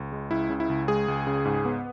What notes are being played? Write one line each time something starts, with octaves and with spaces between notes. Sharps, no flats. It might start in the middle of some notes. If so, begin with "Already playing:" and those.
Already playing: C#2
G#3
C#2 E4
C#3
E4
C#2
G#3 G#4
C#2
C#3
G#2
B3